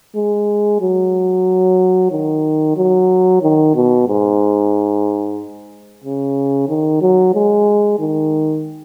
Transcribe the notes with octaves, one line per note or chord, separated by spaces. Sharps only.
G#3
F#3
D#3
F#3
D#3
B2
G#2
C#3
D#3
F#3
G#3
D#3